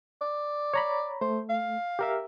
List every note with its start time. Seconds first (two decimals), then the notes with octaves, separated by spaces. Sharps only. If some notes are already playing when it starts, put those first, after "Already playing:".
0.21 D5
0.74 C#5 A#5 B5
1.21 A3 C5
1.50 F5
1.99 G4 A#4 E5